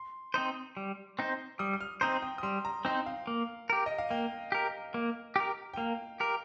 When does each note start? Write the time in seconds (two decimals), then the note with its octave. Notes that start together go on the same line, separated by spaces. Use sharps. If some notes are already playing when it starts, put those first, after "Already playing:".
Already playing: C6
0.34 C4 D#4 C5
0.77 G3
1.19 C4 D#4 C5
1.59 G3 D#6
1.73 D#6
1.81 F6
2.01 C4 D#4 C5 A#5
2.22 G5
2.38 D#6
2.43 G3 C6
2.65 A#5
2.85 C4 D#4 C5 G5
3.06 F5
3.27 A#3
3.70 G4 A#4
3.86 D#5
3.98 F5
4.11 A#3 G5
4.52 G4 A#4
4.94 A#3
5.36 G4 A#4
5.74 G5
5.77 A#3 F5
6.20 G4 A#4